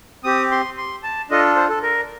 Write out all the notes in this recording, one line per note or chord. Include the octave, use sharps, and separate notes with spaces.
C4 G4 D#6
C6
C6
A5
D4 F4 A4 D#5
C5
A4
A#4